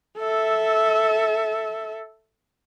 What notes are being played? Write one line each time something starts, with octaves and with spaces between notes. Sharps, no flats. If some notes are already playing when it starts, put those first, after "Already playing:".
A4 E5